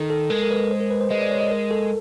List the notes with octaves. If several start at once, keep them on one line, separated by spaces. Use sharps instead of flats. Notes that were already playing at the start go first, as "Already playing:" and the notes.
Already playing: D#3 A4
A4
G#3 A#4
A#4
B4
C5
A#4
B4
C5
G#3 D#5
D5
C#5
D#5
A#4
A4